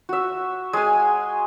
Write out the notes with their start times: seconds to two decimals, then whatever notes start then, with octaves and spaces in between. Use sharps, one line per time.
0.09 F#4 E5
0.73 G#3 G#5